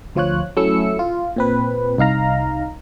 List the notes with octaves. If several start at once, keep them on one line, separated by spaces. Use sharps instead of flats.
D2 F3 F4 C#5 F#6
F#3 A3 C#4 E4 E6 C#7
F4
A#2 C4 B4
C2 D#4 F5 A#5